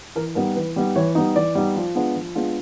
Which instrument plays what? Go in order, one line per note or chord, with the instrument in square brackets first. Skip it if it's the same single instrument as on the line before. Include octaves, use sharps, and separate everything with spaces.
[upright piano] E3 A#4
G3 B3 D#4 A#4
E3 B4
G3 B3 D#4
E3 C#5
G3 B3 D#4
E3 D5
G3 B3 D#4
F3
G#3 B3 D4 F4
F3
G#3 B3 D4 F4